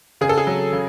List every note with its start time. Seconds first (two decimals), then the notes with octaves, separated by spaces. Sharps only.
0.21 C#3 G#4
0.29 A4
0.38 G#4
0.47 F#3
0.73 C#3